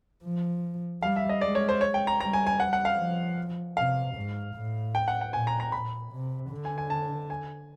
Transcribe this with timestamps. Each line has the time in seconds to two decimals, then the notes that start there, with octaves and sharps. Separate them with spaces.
0.24 F3
1.02 G3 F5
1.16 E5
1.29 D#5
1.41 G#3 D5
1.55 C#5
1.69 C5
1.81 C#5
1.94 G5
2.07 A#5
2.20 G3 A#5
2.33 G#5
2.47 G#5
2.60 F#5
2.73 F#5
2.85 F5
2.98 F3
3.77 C3 F5
4.16 G#2
4.55 A2
4.95 G5
5.08 F#5
5.21 F#5
5.33 A#2 G#5
5.47 A#5
5.60 A#5
5.72 A#2 B5
6.12 C3
6.51 D3
6.65 G#5
6.78 G#5
6.90 A5
7.30 G#5